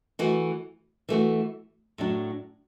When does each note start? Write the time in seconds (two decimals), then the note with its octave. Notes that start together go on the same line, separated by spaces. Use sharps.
0.19 E3 A3 F#4
1.09 E3 A3 F#4
1.98 A2 F#3 D4